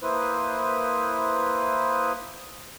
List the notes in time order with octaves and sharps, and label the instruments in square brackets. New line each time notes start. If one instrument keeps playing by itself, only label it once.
[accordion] A#3 E4 B4 C5 D#6